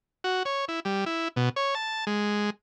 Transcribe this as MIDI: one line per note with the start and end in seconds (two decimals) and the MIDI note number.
0.24 0.43 66
0.45 0.65 73
0.68 0.80 64
0.85 1.05 55
1.06 1.28 64
1.36 1.49 47
1.56 1.75 73
1.75 2.05 81
2.07 2.50 56